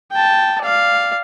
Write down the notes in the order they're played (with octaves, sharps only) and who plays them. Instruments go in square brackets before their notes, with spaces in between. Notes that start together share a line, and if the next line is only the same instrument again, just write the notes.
[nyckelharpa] G5 A5
D5 F5